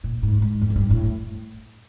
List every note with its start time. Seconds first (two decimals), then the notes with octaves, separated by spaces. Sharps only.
0.04 A#2
0.23 G#2
0.42 G#2
0.61 F2
0.70 G#2
0.76 G2
0.91 A2